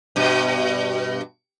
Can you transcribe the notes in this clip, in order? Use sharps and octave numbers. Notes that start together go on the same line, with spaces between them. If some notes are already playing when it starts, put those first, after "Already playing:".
G2 B2